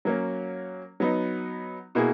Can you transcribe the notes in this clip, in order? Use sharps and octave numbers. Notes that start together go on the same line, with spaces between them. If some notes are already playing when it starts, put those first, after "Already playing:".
F#3 A#3 C#4
F#3 B3 D#4
B2 A#3 E4 G#4